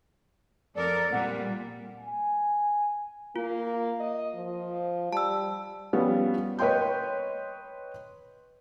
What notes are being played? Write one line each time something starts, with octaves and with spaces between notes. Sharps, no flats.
F2 A4 A#4 D5
A#2 G3 F#5
G#5
A#3 F4
D#5
F3
G3 A5 E6
F3 G3 B3 C#4
B4 C#5 D#5 G5 C6 G6